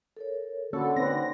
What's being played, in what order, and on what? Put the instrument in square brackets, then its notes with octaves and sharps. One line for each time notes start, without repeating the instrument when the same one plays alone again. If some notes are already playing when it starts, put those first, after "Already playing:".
[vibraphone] A4 A#4 C#5
[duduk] D3 [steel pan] A#3 C#4 C#5 [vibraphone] F#4 F#5 B5 [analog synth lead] A4
[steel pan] C4 B4 [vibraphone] D#4 C#5 C6 [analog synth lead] A#6